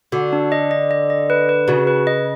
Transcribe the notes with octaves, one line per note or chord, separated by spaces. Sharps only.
D3 F#4
D4
D#5
D#5
D#5
D#5
B4
B4
C#3 F#4
B4
D#5